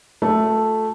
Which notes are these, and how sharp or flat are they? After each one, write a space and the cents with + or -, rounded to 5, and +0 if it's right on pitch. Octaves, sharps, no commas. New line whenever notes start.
A3 +0 F#4 -45 A4 -5